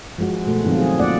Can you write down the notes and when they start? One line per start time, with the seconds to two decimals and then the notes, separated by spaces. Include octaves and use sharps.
0.18 F3 G#3 F#4
0.47 B2 A3 F#4
0.65 D#3 F3 F#3 C4 F4
0.78 G#4
0.99 A#3 F4 D5 F#5